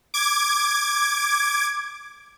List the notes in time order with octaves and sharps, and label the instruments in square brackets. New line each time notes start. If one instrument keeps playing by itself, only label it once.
[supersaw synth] D6 G#6